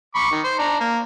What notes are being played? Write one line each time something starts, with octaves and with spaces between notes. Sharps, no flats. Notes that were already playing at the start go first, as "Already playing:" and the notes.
B5 C#6 D6
D#3
C5
D4 A#5
A#3